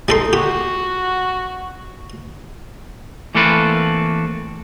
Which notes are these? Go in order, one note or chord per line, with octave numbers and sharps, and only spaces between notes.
G3 D#4 A4 C6
F#4 G4
E3 A3 A#3 C4 A4 B4